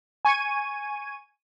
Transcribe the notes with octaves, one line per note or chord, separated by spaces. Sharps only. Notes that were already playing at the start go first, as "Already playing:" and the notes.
G#5 C#6 G#6 D#7